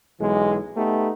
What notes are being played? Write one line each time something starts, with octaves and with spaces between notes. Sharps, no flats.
B1 E3 G#3
A3 B3 D#4 G4